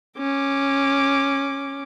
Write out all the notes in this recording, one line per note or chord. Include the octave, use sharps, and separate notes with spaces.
C#4 D6